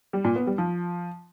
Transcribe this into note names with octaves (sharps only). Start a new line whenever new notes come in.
G3
A#2
B3
G3
F3